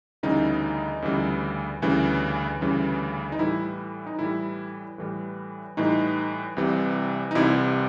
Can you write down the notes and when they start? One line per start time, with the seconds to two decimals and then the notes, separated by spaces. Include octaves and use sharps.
0.23 D2 C#3 E3 G3 D#4
1.02 D2 C#3 E3 G3
1.82 D2 C#3 E3 G3
2.61 D2 C#3 E3 G3
3.32 D#4
3.39 A2 E3 G3 E4
4.07 D#4
4.19 A2 E3 G3 E4
4.98 A2 E3 G3
5.77 A2 E3 G3 D#4
6.57 C2 C3 E3 G3
7.31 D#4
7.35 C2 C3 E3 G3 E4